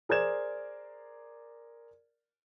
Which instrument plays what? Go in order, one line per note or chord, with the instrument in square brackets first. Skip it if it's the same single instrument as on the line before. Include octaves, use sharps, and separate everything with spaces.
[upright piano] G#4 A#4 C5 D5 G#6 E7